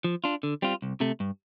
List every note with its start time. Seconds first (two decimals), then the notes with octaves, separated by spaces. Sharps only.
0.04 F3
0.24 D4 F4
0.43 D3
0.62 G3 C4 F4
0.82 C2
1.01 C3 A3
1.20 G2